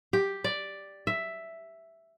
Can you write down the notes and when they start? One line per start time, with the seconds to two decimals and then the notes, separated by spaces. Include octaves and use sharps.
0.13 G4
0.44 D5
1.07 E5